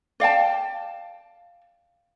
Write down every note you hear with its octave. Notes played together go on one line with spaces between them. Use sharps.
D5 F5 G5 A5